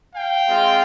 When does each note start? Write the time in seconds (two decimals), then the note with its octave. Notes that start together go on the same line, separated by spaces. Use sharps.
0.15 F5 G5
0.48 G#3 C4 F4